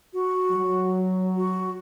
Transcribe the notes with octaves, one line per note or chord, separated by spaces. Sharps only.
F#4
F#3
F#4